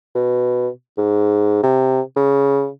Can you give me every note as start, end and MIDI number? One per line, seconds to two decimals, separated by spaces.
0.15 0.69 47
0.98 1.61 44
1.63 2.01 48
2.17 2.69 49